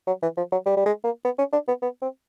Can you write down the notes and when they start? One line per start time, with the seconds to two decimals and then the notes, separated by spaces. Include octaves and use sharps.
0.07 F#3
0.23 E3
0.37 F3
0.52 F#3
0.66 G3
0.77 G3
0.86 G#3
1.04 A#3
1.25 B3
1.38 C#4
1.53 D4
1.68 B3
1.82 B3
2.02 C4